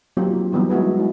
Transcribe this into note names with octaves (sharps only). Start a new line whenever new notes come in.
F#3 A#3 C4 F4 G4
D#4
E3 F#3 G3 B3 D#4
G#3 E4 F#4 G#4 B4
G#3 E4